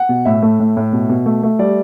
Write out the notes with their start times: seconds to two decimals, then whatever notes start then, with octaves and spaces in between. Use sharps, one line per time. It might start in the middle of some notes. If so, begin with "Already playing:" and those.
Already playing: F#5
0.09 B2
0.25 A2 E5
0.42 A3
0.60 A2
0.77 A2
0.93 B2
1.09 B2
1.26 A3
1.43 A3
1.59 G3 D5